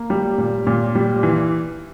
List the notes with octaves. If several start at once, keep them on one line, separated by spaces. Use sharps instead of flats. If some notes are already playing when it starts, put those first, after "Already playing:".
Already playing: A#3
G3
A#2
A#2
G3
E3